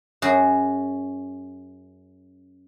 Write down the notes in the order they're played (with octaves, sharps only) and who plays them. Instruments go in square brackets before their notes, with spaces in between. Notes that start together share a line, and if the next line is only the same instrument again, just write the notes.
[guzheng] F#2 F#4 G#4